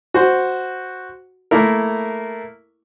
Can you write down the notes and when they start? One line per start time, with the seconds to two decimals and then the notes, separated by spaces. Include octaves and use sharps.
0.14 F#4 C5
1.51 A3 A#3 E4 A#4